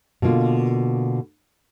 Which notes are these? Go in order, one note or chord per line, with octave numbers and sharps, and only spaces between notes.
B2 D3 A#3 F4